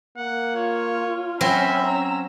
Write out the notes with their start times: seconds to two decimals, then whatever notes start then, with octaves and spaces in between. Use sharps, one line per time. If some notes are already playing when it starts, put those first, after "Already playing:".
0.17 A#3 F#5
0.56 F4 C#5
1.41 F#3 C4 C#4 C5 E5 B5
1.87 C#4 A#5 E6